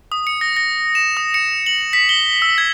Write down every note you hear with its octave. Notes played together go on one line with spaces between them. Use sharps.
D#6
C#7
A#6
A#6
E7
D#6
C#7
F#7
B6
G7
E6
G#6